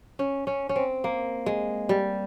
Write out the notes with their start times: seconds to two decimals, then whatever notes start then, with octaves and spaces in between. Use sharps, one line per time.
0.19 C#4
0.47 C#4
0.69 C#4
0.76 C4
1.04 A#3
1.46 G#3
1.89 G3